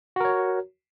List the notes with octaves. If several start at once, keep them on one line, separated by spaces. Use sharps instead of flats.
F#4 A#4 C#5